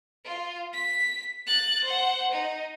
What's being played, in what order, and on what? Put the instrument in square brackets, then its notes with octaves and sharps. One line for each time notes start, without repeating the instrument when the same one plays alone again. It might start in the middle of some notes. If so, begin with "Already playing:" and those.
[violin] F4
B6
F#6 A6
C5 F#5
D#4